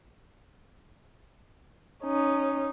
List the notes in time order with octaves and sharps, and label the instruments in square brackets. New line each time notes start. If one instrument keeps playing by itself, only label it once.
[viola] C#4 D#4